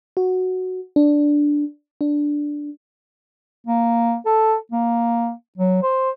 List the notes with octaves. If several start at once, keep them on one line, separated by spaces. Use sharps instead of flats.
F#4
D4
D4
A#3
A4
A#3
F#3
C5